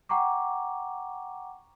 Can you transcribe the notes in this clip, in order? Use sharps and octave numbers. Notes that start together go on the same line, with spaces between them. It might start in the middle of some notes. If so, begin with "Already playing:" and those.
F#5 G5 A#5 C#6 D6